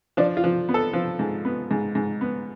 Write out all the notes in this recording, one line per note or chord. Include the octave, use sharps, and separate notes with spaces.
F3 D4
F4
F3
B3
A4
F3
G#2
B3
G#2
G#2
B3